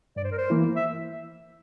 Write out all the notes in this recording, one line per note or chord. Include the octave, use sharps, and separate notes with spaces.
G2 D5
C5
A#4
C5
E3 A#3 E4
E5